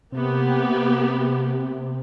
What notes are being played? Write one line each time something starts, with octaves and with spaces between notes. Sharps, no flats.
C3 A#3 B3 G4